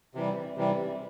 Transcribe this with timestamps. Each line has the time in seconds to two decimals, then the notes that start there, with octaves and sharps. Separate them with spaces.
0.15 C3 E3 G3
0.56 C3 E3 G3